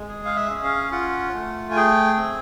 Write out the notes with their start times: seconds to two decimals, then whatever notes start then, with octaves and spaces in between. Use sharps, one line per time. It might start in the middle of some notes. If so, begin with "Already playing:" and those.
Already playing: G#3
0.08 G#4
0.25 F5
0.36 E5
0.50 C#4
0.64 F5
0.92 F4 F#5
1.34 A3
1.71 G#5
1.76 G#4 G5
2.18 C4